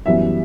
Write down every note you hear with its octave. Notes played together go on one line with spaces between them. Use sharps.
F#2 E3 G3 B3 E5